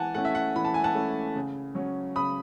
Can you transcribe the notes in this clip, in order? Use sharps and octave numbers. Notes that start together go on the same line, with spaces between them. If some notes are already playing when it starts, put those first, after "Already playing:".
Already playing: E3 F#5 G#5 A5
A3 C#4 E4 F#5
E5
F#5
E3 B5
A5
G#5
F#5 A5
A3 C#4 E4
C#3
F#3 C#4
C#3 B5 D#6